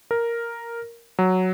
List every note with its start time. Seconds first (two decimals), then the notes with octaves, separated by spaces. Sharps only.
0.11 A#4
1.19 F#3